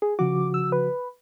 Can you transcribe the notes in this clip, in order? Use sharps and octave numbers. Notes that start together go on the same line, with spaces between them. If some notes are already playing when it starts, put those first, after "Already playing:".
G#4
C#3 F3 F#4 D6
E6
B4